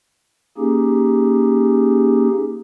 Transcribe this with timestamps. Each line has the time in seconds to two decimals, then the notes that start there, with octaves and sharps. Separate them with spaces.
0.58 A#3 C#4 D#4 G4 G#4